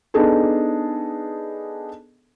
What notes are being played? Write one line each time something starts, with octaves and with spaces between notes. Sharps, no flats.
B3 D4 D#4 G#4 A4